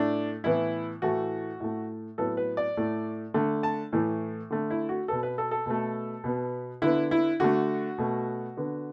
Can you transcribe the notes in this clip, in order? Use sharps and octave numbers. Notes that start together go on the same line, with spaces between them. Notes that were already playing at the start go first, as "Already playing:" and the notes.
Already playing: A2 A3 D4
A2 E3 B3 E4
A2 E3 A3 F#4
A2 A3
A2 F#3 B3 A4
B4
D5
A2 A3
D3 A3
A5
A2 E3 A3
D3 A3
E4
F#4
B2 B3 A4
B4
A4
A4
B2 A3
B2 B3
D3 B3 E4
E4
D3 A3 F#4
B2 A3
D3 B3